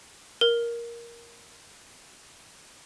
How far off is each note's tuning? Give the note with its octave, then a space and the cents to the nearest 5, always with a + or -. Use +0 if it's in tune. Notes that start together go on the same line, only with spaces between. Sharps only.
A#4 +10